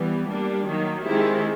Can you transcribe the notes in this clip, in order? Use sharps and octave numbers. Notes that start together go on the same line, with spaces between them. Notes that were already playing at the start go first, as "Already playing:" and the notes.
Already playing: E3 G3 B3
G3 A#3 D4
D#3 F#3 A#3
D#3 G#3 C4 E4 G4